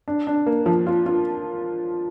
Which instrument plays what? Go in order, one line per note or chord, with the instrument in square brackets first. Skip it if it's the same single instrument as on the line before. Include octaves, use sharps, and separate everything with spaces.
[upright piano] D4
D4
A#3
F3
F4
F4